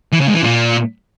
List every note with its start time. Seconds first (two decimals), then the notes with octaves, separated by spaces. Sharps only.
0.12 E3
0.20 C#3
0.27 G#2
0.35 E3
0.42 A#2